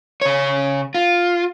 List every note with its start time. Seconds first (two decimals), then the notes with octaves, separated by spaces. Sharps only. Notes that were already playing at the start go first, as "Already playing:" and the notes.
0.22 C#3 C#5
0.95 F4